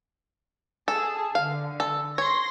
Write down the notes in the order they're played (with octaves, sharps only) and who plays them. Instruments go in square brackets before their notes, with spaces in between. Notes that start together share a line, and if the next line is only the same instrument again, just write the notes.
[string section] G#4 A5 [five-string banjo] A4
[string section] D3 [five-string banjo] F5
[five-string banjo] A4
[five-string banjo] C#5 [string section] C6 A#6